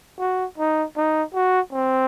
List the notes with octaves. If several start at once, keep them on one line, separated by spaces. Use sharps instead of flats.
F#4
D#4
D#4
F#4
C4